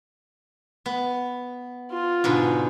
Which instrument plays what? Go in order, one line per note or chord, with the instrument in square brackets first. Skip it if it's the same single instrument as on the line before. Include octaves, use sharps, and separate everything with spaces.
[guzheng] B3
[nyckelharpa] F4
[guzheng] G#2 B2 D3